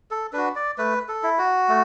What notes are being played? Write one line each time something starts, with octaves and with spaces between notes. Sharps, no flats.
A4
D4 F#4 B4
D5
A3 B4
A4
E4
F#4
A3